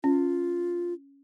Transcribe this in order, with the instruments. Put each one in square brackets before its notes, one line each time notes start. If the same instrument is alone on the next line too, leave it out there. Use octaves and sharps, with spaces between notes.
[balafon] C#4 [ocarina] F4